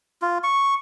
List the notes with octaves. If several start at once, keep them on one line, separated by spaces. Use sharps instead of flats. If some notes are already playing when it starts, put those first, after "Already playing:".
F4
C#6